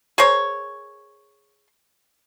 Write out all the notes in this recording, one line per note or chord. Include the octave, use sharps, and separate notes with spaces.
G#4 A#4 C5 C#5